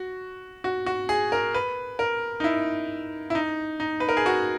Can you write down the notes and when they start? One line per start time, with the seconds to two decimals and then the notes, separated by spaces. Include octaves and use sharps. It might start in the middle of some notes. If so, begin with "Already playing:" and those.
Already playing: F#4
0.64 F#4
0.86 F#4
1.09 G#4
1.32 A#4
1.54 B4
1.99 A#4
2.40 D#4
2.44 E4
3.30 E4
3.35 D#4
3.80 D#4
4.00 B4
4.09 A#4
4.17 G#4
4.26 F#4